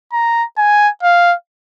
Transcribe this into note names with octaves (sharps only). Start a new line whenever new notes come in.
A#5
G#5
F5